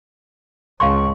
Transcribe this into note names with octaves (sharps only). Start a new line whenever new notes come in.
C#2 F5 A5 C6 C#6